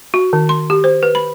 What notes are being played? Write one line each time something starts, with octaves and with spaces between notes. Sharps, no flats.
F#4
D#3
C6
G4
C5
B4
B5